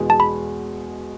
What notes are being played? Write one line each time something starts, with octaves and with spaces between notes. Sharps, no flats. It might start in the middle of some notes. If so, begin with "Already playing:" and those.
Already playing: E2 B2 G#3
A5
B5